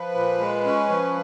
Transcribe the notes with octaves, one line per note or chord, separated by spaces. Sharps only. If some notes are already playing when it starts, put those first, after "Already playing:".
Already playing: F3 B4
A#2
G#3
C#4
F3